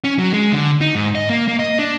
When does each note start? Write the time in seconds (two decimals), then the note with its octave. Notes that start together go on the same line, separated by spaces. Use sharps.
0.04 C#4
0.19 F#3
0.34 G#3
0.52 D3
0.81 D#4
0.95 G#2
1.15 D#5
1.30 A#3
1.48 A#3
1.59 D#5
1.79 D4